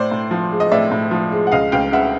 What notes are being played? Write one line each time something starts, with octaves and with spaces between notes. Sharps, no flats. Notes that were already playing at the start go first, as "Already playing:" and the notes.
Already playing: A2 C5 D5
A2
F3
G#3
D#5
A2 D5 E5
A2
F3
G#3
F#5
C#2 D#5 F5
C#2 F5 G5
C#3 E5 F#5